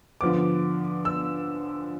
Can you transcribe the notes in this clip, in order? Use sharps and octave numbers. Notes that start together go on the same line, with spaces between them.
D3 F3 B3 D6
E6